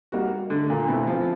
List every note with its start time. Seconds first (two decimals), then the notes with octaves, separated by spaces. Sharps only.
0.12 G3 A#3 D#4 F#4
0.50 D3 A3
0.70 A#2
0.88 B2 C4 E4 A4
1.07 F3